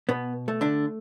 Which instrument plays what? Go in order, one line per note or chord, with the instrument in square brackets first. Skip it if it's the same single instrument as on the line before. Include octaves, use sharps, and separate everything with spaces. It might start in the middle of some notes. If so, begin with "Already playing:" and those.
[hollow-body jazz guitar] B2 B3
A3
D3 D4